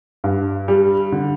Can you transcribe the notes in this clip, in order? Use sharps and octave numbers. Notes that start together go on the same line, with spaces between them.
G2
G3
D3